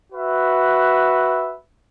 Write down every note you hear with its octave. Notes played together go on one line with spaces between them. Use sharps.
F#4 B4 E5